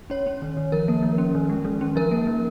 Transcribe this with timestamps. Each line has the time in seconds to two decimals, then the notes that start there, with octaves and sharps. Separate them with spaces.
0.10 C#4 C#5
0.27 C#4
0.42 D#3
0.57 D#3
0.72 F3 A#4
0.88 A#3
1.03 F3
1.18 C#4
1.35 D#3
1.49 G#3
1.65 D#3
1.81 C#4
1.96 F3 A#4
2.11 A#3
2.27 F3